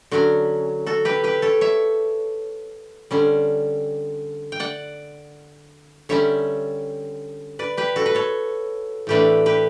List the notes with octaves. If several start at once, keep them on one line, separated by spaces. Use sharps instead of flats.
D3 F#3 C#4 F#4
F#4 A4
G4 B4
G4 B4
A4 C#5
C#5 E5
D3 G3 C#4
G5
D5 F#5
D3 G3 C#4 C#5 E5
B4 D5
G4 B4
F#4 A4
B4
A4 C#5
A2 E3 A3 D4 G4 B4
G4 B4